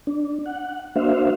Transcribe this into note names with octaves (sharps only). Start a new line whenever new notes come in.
D4
F#5
A#3 D4 F#4 C5 E5 F5